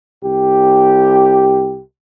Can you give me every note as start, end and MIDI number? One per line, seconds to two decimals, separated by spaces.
0.22 1.81 36
0.22 1.81 67